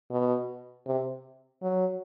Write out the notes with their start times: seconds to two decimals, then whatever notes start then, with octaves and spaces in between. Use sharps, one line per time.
0.11 B2
0.87 C3
1.62 F#3